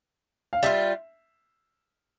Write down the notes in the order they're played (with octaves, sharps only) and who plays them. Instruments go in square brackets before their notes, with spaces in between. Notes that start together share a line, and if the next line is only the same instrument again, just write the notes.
[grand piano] F5
[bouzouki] G3 B3 D4 F4 [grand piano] E5